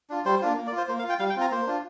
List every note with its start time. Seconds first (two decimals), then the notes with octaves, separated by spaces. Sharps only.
0.10 D4 F4
0.25 G3 C5
0.42 A#3 D4 F4
0.57 A#3
0.67 D5
0.72 F4
0.78 C5
0.88 A#3 C5
0.99 F5
1.04 F4
1.09 G5
1.19 G3 F5
1.30 G5
1.36 C4 F4 A#5
1.51 A#3 C5
1.67 D4 F4